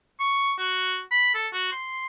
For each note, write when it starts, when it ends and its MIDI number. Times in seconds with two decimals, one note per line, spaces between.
0.20 0.53 85
0.59 1.00 66
1.11 1.31 83
1.34 1.48 69
1.53 1.70 66
1.72 2.06 84